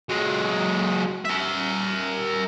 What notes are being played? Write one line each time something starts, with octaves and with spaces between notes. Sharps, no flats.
F#3 G#3
A#4 E5